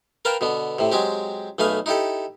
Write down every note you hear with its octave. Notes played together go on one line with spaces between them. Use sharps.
A#4 B4 F5 G5 A5
B2 D3 B3
A2 C3
F#3 G#3 C4 G4
B1 A3 G#4 B4 F5
D#4 E4 G4 A4